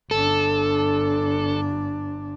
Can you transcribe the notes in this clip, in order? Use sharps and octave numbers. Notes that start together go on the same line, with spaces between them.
G1 D4 A4